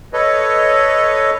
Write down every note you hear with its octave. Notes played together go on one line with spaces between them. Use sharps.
A4 B4 C#5 D#5